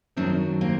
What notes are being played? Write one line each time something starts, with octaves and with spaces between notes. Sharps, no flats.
F#2 D#3 F#3 C4 D4
A#3 C4